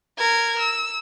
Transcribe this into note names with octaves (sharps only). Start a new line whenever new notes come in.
A#4 G#6
E6